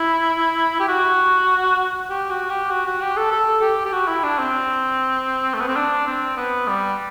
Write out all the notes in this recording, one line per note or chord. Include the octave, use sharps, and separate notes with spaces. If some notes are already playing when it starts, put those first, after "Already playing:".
Already playing: E4
G4
F#4
G4
F#4
G4
F#4
F#4
G4
A4
A4
G4
G4
F#4
E4
D4
C4
A3
B3
C4
D4
C4
B3
G3